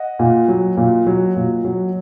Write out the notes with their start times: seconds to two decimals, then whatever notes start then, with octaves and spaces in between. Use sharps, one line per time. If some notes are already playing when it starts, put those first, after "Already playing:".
Already playing: D#5 F#5
0.19 A#2
0.48 F#3
0.77 A#2
1.07 F#3
1.36 A#2
1.65 F#3